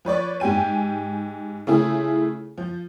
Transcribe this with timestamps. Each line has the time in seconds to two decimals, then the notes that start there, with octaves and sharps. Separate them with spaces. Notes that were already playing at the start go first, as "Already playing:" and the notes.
0.05 F3 B4 C#5 D5
0.40 G#2 G4 G5 G#5 D#7
1.67 C#3 A3 E4 F4 G#4
2.58 F3